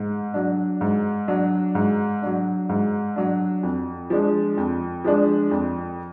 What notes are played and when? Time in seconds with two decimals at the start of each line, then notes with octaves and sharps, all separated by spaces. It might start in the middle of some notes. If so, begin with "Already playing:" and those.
Already playing: G#2
0.34 F#3 D4
0.81 G#2
1.28 F#3 D4
1.75 G#2
2.22 F#3 D4
2.69 G#2
3.16 F#3 D4
3.63 F2
4.10 F3 G#3 D4
4.58 F2
5.04 F3 G#3 D4
5.51 F2